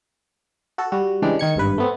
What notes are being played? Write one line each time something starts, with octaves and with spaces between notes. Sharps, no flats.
F#4 A4
G3 F#4
C#3 E3 G3 G#3 D4 G4
D#3 G#6 C#7
G#1 G2 B4
A3 B3 C4